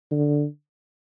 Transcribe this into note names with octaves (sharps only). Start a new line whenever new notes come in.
D3